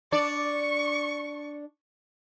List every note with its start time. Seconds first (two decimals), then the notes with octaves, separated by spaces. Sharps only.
0.12 D4 D5 C#6